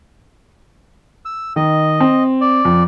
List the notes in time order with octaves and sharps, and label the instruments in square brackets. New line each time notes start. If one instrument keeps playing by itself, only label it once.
[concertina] E6
[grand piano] D#3 [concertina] D#5
[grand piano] C4
[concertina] D5
[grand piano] F2